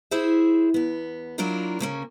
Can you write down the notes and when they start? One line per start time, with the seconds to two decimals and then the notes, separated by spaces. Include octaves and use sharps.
0.11 E4 G#4 C5 E5
0.74 E2 B3
1.38 F#3 A#3 D4 E4 F4 A#4
1.79 D2 C#3 A#3 C#4